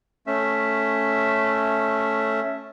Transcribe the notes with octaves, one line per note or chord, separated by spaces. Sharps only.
A3 C#4 E5